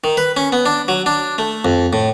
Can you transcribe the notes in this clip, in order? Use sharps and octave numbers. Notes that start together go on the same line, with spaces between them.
D#3
B4
C#4
B3
D4
F#3
D4
A3
F2
A2